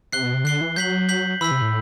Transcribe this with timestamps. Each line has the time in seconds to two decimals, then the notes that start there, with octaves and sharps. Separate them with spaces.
0.13 C3 F#6 C7 G7
0.23 B2
0.34 C3
0.44 D3 F#6 C7 G7
0.61 E3
0.76 F#3 G6 B6 F#7
1.09 G6 B6 F#7
1.41 E3 B5 E6 B6
1.51 C3
1.62 A2